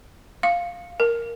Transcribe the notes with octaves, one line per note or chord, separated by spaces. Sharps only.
F5
A#4